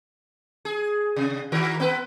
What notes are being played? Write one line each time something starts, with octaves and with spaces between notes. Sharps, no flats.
G#4
C3
D#3 F#4 A#4
B3 B4